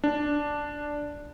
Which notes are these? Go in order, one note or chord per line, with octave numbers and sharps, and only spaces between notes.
D4